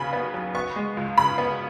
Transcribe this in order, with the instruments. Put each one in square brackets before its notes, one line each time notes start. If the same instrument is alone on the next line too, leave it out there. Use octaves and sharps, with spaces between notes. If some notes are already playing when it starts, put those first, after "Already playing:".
Already playing: [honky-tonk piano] D#2 C#3 F#3 B3 G#5 B5
B3
F#3
B3 C#6
G#3
C#2
C#3 B5
B3